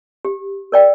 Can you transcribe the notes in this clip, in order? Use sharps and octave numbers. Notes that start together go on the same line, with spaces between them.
G4
A#4 D5 G5